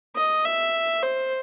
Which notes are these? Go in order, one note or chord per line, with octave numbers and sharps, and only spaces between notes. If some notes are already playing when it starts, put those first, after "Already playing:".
D#5
E5
C5